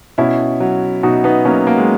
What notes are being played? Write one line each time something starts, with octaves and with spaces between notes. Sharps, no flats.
B2 C#4 E4
F#3
B2 D#4 F#4
B3 D#4
F#3 A#3 C#4
A#3
G#3